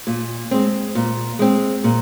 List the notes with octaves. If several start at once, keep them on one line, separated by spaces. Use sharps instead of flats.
A#2
G#3 C4
A#2
G#3 C4
A#2